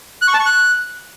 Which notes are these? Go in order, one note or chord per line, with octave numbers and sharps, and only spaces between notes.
F#6
C#6
A5
C#6
F#6